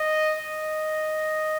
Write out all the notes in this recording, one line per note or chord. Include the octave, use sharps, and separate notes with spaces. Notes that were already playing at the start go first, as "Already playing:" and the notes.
Already playing: D#5
D#5